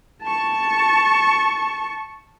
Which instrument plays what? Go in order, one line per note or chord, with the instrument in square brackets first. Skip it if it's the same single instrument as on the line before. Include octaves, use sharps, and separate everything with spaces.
[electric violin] A5 C#6